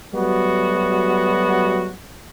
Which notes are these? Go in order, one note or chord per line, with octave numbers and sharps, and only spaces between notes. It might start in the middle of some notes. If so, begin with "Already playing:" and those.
F#3 G3 A3 B3 F#4